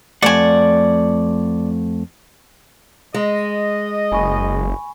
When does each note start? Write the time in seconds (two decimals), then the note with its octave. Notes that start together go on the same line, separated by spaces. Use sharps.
0.22 F2 A3 D5 F#5 G#5
3.14 G#3 D#5
4.12 F#1 G#5 B5 C#6